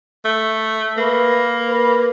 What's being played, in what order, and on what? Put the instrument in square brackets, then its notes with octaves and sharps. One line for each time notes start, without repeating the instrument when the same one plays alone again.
[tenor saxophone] A3
[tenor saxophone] A#3 [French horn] B4
[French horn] B4